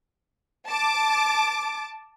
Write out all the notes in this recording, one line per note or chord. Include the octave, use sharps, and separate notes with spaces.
A5 D6